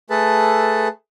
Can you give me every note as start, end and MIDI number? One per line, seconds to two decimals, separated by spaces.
0.10 0.88 57
0.10 0.88 68
0.10 0.88 69
0.10 0.88 71
0.10 0.88 81